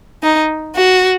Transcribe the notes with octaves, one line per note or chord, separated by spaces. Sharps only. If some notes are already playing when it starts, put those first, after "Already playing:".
D#4
F#4